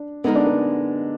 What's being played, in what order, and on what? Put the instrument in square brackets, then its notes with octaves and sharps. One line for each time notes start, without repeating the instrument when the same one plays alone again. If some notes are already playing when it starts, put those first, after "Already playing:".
Already playing: [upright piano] D4
[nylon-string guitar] D3 G#3 D#4 A#4 [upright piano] B3
[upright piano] D4
B3